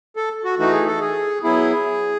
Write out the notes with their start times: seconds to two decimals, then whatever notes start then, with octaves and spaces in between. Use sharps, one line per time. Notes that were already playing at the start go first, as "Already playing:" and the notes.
0.17 A4
0.45 F#4
0.58 E3 A3 D#4 F#4
0.72 G#4
0.87 A4
1.01 G#4
1.43 F#3 B3 E4 G#4